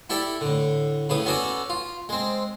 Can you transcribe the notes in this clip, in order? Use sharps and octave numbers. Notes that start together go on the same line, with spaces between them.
E4 G4 A4 D5 G5
A2 D3
A2 C#3 B4 D#6
B3 C#4 F#4 A4 D5
F4
G#3 C4